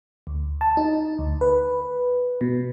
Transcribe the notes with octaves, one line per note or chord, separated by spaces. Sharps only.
D2
A5
D#4
D2
B4
B2